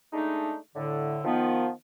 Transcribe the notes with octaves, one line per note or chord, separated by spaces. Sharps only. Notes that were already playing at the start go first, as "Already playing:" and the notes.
G#3 A3 D4 D#4
A2 D3
D#3 F3 B3